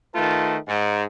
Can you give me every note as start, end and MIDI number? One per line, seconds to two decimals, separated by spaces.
0.15 0.57 51
0.15 0.57 57
0.15 0.57 65
0.15 0.57 71
0.15 0.57 81
0.68 1.03 44